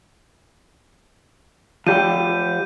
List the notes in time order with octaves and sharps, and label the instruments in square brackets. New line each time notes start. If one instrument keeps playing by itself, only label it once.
[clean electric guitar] F3 G4 G5 [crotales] G6 D#7